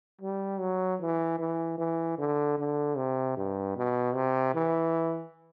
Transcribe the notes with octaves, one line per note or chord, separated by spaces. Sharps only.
G3
F#3
E3
E3
E3
D3
D3
C3
G2
B2
C3
E3